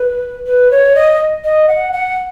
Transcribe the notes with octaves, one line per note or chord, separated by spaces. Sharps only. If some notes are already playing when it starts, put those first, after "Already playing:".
Already playing: B4
B4
C#5
D#5
D#5
F#5
F#5